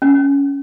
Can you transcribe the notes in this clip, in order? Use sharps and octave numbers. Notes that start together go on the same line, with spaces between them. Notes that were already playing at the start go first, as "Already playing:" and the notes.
C#4